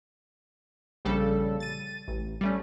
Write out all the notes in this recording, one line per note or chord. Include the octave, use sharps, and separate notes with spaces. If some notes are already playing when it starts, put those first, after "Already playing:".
A#1 C#3 G3 A4
A6 D#7
A1
G3 A3 C#4